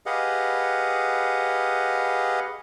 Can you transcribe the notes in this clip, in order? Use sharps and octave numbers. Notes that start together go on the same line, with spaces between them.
G4 G#4 B4 D#5 F5 F#5